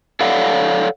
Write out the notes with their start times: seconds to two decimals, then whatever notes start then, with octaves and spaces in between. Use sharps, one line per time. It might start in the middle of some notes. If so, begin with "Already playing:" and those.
0.21 A4 C#5 D5 F5 F#5